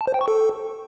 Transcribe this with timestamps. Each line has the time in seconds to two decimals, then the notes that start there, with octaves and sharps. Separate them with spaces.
0.01 A5
0.07 C5
0.14 G5
0.21 C#6
0.28 A4